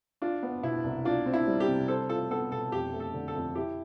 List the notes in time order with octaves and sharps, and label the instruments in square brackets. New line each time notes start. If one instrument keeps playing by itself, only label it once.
[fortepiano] D4 [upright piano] F4
[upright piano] B3
[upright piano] B2 [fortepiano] E4
[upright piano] C2
[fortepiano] D4 [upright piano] F4
[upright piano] C4
[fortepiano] E4
[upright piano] G3
[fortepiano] G4
[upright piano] C3
[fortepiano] A4 [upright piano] C5
[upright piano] F4 [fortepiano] A4
[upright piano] B3 [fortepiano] A4
[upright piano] B2 [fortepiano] A4
[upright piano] F2 [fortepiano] G4
[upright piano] A3
[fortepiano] A4
[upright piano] D3
[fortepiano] A4
[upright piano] F2
[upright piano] E4 [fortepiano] G4